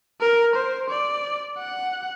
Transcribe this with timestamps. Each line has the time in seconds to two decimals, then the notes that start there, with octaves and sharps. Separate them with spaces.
0.21 A#4
0.55 C5
0.90 D5
1.58 F#5